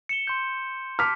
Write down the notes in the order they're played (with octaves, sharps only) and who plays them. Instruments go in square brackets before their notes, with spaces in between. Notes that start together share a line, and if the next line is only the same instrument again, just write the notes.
[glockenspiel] C#7 E7 G7
C6 G6
[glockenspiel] A5 B6 [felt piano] D6 F6